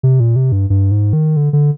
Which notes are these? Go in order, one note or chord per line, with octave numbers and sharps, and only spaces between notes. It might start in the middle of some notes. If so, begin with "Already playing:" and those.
C3
A#2
C3
G2
G2
G#2
D#3
D3
D3